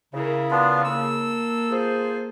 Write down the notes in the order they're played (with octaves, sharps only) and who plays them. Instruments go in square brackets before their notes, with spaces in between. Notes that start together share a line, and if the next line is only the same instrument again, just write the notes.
[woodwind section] C#3 [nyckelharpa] E4 A#4
[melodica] B3 D4 F4
[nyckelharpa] A#3 A4 [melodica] E6
[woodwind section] F4 G#4 C5